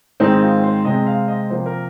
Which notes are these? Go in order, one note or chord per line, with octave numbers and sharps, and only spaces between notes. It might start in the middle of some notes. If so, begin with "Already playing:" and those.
G#2 D#3 G#3 C4 D#4
F4
C5
C3 G#3 C4 D#5
F5
D#5
C3 F3 A#3 C5
A#4